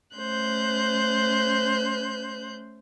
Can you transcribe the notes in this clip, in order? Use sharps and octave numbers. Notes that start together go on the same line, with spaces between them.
A3 C#4 C5 F#6 G6